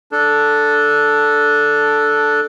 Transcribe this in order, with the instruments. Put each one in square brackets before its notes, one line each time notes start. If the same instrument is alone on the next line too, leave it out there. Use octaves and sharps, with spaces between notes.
[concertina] D4 A4